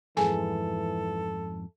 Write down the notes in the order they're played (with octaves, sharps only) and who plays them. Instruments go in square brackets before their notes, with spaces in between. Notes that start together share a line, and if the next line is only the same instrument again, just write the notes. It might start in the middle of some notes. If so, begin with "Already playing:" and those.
[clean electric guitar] F2 G#2 [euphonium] E3 [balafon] G#4 G#5 [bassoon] A4